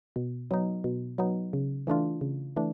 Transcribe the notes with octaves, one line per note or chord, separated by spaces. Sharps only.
B2
F#3 B3 D#4
B2
F#3 B3 D#4
C#3
E3 A3 D4 F4
C#3
E3 A3 D4